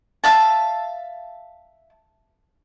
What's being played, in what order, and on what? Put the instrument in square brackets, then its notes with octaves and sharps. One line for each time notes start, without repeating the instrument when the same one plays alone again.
[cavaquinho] E5 F5 A5